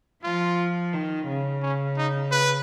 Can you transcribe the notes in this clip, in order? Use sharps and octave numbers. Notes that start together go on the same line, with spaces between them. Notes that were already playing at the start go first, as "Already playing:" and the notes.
F3 F4
D#3
C#3
C#4
D#4
B4